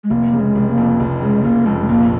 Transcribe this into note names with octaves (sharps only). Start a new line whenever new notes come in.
G#3
F1 A#3
C#3
G#3
F1
A#3
F2
F1
C#3 G#3
F1 A#3
F2 G#3
G#3
A#1 A#3